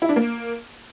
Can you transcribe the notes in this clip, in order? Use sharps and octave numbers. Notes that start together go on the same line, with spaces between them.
E4
D4
A#3